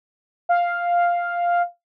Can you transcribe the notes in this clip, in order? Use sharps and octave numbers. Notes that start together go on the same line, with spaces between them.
F5